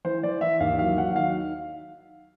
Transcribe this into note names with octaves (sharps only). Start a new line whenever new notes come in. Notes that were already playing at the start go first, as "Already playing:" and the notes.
E3 C5
E3 D5
E3 E5
D#2 F5
F#3 F5
F#3 F#5
D#3 F5